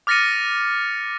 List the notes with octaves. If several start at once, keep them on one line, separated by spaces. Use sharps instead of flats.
D6 F6 A6 A#6 C#7 D#7